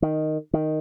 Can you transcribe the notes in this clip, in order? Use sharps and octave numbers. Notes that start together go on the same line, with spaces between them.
D#3
D#3